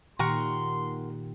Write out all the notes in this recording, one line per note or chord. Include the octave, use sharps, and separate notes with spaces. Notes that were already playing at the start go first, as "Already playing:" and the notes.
A#2 D#3 G4 A#4 F#5 C6 C#6